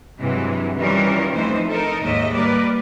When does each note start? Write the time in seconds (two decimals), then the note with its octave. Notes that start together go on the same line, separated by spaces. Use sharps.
0.18 G2 C3 E3 F#3 G#3
0.78 D#3 E3 G3 C#4 F4 A#4
1.34 F2 E3 A3 D#4 C5
1.68 D#4 A4 A#4
2.02 D#2 G#2 G#3 D#5 E5
2.33 G3 A#3 A#4 B4 D5